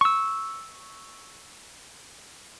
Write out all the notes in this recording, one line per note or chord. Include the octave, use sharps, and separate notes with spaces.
C#6 E6